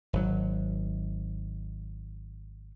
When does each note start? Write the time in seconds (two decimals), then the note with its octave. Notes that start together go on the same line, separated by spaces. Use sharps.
0.13 G#1 F#3